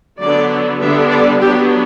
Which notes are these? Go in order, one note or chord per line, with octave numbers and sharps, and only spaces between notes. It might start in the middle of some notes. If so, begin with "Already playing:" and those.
D3 F#3 B3 D5
D3 G3 B3 D4 E5
D5
F#3 B3 D4 G4